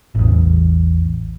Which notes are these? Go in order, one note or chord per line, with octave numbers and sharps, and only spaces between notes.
A1 E2